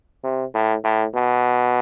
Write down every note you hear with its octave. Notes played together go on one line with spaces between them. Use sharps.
C3
A2
A2
B2